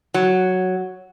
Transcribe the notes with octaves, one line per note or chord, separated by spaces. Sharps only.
F#3